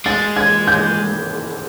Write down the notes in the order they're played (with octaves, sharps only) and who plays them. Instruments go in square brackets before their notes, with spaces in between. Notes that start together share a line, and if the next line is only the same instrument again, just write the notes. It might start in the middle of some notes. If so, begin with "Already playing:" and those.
[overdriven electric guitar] G#3 [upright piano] A6
[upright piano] G#6
G6